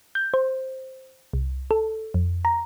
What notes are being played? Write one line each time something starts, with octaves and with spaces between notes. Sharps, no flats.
G6
C5
C2
A4
F2
A#5